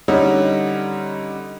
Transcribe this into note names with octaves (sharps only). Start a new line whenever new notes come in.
D3 G3 C#4 D#4